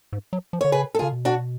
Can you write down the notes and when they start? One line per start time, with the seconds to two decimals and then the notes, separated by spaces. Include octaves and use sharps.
0.13 G#2
0.33 F#3
0.53 F3
0.61 D3 C#5
0.72 C#3 G#4 B4
0.95 A4
0.99 F4 G#4
1.02 C#3
1.12 B2
1.25 D4 F#4